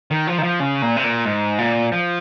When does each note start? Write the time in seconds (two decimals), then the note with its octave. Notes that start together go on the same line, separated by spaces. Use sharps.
0.11 D#3
0.27 F3
0.38 D#3
0.43 F3
0.60 C#3
0.82 A#2
0.96 C3
1.04 A#2
1.25 G#2
1.58 A#2
1.92 F3